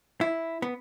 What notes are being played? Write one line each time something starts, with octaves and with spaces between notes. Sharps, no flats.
E4
B3